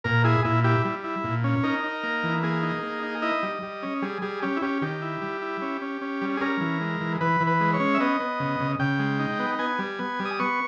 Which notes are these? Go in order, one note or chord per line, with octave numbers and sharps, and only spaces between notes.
A#2 A#4
E4 G#4
A#2 E4
E4 G4
G3
E4
A#2
C#4
D#4 A#4
D#4
A#3
E3
A#3 G#4
D#4
A#3
D#4
E4 D#5
G3
G3
C#4
G3 G#4
G3 G#4
C#4 G4
E4
C#4 G4
D#3 G4
E4
G3
E4
C#4
C#4
C#4
G3
G#4
C#4 A#4
E3
G#3
E3
E3 B4
E3
B4
G#3
C#5
C#4
E5
B3 D#5
B3
C#3
C#3
C#3 G5
G#3
D#4
B3
B3 G#5
G3
B3
G3
D#6
B3 C#6